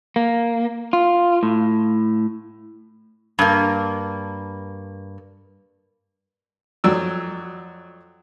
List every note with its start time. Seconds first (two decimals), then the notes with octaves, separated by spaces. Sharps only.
0.16 A#3
0.93 F4
1.43 A2
3.39 G2 A#3
6.84 F2 F#3 D5 E6